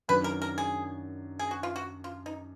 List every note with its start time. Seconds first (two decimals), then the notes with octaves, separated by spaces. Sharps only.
0.09 F#2 D#3 F#3 D4 B4
0.24 A#4
0.42 A#4
0.58 G#4
1.39 G#4
1.51 F#4
1.63 F4
1.76 F#4
2.04 F4
2.26 D#4